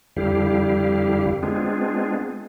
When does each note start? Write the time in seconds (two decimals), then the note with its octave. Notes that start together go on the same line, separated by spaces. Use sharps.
0.16 F2 D3 G3 E4 G4 F5
1.43 G#3 B3 C4 D4 F4 G#4